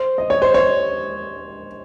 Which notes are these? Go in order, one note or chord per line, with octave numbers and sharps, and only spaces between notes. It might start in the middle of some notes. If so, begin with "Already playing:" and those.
Already playing: C5
D#5
C#5
C5
C#5